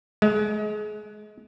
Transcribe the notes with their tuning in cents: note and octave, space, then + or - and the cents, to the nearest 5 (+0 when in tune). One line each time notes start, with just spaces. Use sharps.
G#3 +30